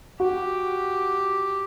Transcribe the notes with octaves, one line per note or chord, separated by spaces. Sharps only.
F#4 G4